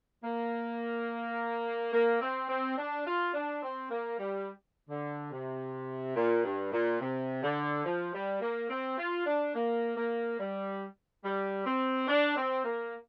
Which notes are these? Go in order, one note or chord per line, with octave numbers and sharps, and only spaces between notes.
A#3
A#3
C4
C4
D4
F4
D4
C4
A#3
G3
D3
C3
A#2
G2
A#2
C3
D3
F3
G3
A#3
C4
F4
D4
A#3
A#3
G3
G3
C4
D4
C4
A#3